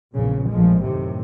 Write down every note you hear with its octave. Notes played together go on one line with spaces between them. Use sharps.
A#1 E2 A#2 C#3
A#1 A2 F3 G#3
F#2 A2 C3 D#3